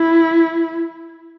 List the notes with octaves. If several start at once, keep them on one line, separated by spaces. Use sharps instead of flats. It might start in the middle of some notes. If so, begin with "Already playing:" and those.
Already playing: E4